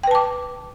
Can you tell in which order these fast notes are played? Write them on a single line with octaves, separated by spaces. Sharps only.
G5 B4 A5 D6